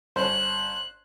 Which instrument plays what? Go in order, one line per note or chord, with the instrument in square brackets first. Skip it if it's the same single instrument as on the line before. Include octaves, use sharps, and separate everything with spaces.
[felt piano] G1 C#4 [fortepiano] C5 [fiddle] F#6